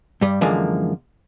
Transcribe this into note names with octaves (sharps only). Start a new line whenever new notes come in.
G2 G3
F#2 D3 E3 F3 G#3 A#3